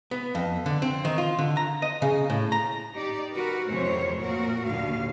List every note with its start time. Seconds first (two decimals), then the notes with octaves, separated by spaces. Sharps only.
0.11 B3
0.35 F2
0.66 D3
0.82 C4
1.05 D#3
1.18 F4
1.39 D3
1.57 A#5
1.82 D#5
2.02 C#3
2.30 A2
2.52 A#5
2.93 D#4 G4 D5
3.31 F#4 A#4 B4
3.68 F2 C3 E3 A3 C5 C#5
4.20 A#2 F#4 A#4
4.66 D#2 A#2 D3 F5